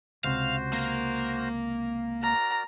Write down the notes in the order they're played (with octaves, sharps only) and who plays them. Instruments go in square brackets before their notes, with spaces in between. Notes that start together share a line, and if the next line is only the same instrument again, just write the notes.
[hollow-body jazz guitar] C#2 C3 [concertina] F#4 C5 [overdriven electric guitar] F5
[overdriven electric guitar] A#3
[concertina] F#4 A#4 D5 [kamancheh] A#5